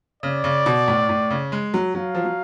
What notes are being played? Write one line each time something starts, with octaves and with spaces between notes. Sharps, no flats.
C#3 D5
C#3
B2
A2
A2
C#3
G#3
F#3
F#3 F5
F3
F#3